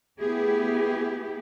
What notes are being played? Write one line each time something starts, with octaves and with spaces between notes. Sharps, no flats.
A3 B3 E4 G4 G#4